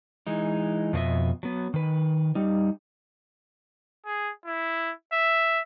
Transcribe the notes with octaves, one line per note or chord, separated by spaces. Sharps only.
E3 G#3 D#4
F2 B2 G#3 D#5 E5
F#3 B3
D#3 B4
G3 D#4
G#4
E4
E5